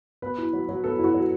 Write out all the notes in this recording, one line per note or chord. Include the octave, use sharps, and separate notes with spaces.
B3 B4
E4
F#3
F#3
B3 A4
E4 F#4
F#3